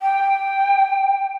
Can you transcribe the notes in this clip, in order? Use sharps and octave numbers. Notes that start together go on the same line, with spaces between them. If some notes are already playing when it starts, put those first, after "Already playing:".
G5